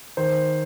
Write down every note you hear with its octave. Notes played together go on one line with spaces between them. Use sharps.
D#3 C5